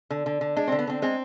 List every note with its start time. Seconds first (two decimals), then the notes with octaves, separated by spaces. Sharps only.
0.10 D3
0.26 D3
0.41 D3
0.56 G#3 D4
0.68 D3 C4
0.79 B3
0.87 D3 C4
1.02 G#3 C4